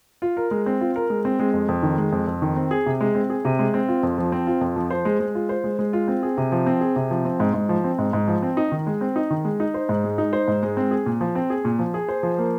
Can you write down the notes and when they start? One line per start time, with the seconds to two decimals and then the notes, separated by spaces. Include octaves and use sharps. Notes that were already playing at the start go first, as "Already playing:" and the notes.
0.22 F4
0.37 A#4
0.51 G#3
0.66 C4
0.81 F4
0.96 A#4
1.10 G#3
1.25 C4
1.39 G#3
1.54 F2
1.68 F2
1.83 D#3
1.98 G#3
2.12 F2
2.27 F2
2.42 D#3
2.56 C4
2.71 G#4
2.86 C3
3.01 G#3
3.15 C4
3.30 G#4
3.45 C3
3.59 G#3
3.74 C4
3.88 F4
4.03 F2
4.18 F3
4.32 C4
4.47 F4
4.61 F2
4.76 F3
4.91 C5
5.05 G#3
5.20 G#3
5.35 F4
5.49 C5
5.64 G#3
5.79 G#3
5.93 F4
6.08 C4
6.23 G#4
6.37 C3
6.52 F3
6.66 C4
6.81 G#4
6.96 C3
7.11 F3
7.25 C4
7.40 G#2
7.54 G#2
7.69 F3
7.84 C4
7.99 G#2
8.13 G#2
8.28 F3
8.42 C4
8.57 D#4
8.72 D#3
8.87 G#3
9.01 C4
9.16 D#4
9.30 D#3
9.45 G#3
9.60 D#4
9.74 C5
9.89 G#2
10.04 G#3
10.18 D#4
10.33 C5
10.48 G#2
10.63 G#3
10.77 C4
10.91 G#4
11.06 A#2
11.21 F3
11.35 C4
11.50 G#4
11.65 A#2
11.79 F3
11.94 G#4
12.09 C5
12.23 F3
12.38 A#3